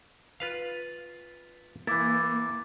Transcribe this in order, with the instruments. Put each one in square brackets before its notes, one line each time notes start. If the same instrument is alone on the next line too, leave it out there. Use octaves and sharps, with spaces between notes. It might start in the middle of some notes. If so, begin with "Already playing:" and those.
[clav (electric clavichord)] F4 B4 F5
[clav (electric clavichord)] E3 E4 [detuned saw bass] A#3 [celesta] D6 A6